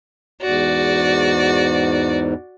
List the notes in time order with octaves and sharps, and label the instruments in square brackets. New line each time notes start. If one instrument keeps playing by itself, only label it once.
[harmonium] E2 G#2 [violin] F#4 D5